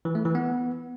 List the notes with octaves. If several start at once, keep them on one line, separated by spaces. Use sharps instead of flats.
E3
A3
E3
B3